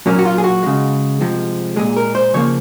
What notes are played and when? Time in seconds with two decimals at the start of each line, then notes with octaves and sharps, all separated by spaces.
0.06 A#2 F#3 A#3 C#4
0.19 F#4
0.25 F4
0.38 G#4
0.44 F#4
0.63 C#3 G#3
1.21 C3 F3 G#3
1.76 A#2 G#3 G#4
1.97 A#4
2.15 C5
2.34 C#3 F3 A#3 C#5